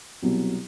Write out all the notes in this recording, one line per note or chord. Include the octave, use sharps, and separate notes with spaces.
C2 B2 F#3